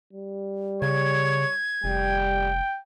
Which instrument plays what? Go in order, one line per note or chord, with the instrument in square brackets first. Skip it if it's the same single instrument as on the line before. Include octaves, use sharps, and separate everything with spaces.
[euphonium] G3
[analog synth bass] C#3 [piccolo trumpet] C#5 [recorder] G#6
[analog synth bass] F1 [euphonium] G3 [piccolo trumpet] G5